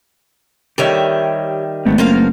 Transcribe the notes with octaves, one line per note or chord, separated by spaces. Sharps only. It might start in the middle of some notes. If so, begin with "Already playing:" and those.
D#3 G3 G4 C#5 E5
G#1 A3 B3 C4
F#1 F3 A#3 F5